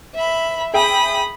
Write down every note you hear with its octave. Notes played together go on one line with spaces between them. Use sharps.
E5 B5
G#4 E5 G5 B5 D#6